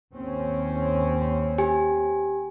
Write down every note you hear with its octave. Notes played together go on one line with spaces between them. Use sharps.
D#2 C4 C#4
G4 G#5